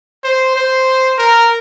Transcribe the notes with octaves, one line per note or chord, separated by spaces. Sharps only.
C5
C5
A#4